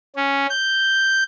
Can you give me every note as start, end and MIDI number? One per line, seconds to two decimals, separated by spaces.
0.16 0.47 61
0.50 1.24 91